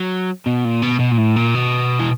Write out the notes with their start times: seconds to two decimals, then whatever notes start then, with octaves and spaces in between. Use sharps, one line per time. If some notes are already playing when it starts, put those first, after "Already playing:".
Already playing: F#3
0.46 B2
0.65 A#2
0.83 B2
1.00 B2
1.12 A#2
1.18 A2
1.36 A#2
1.55 B2
2.00 E3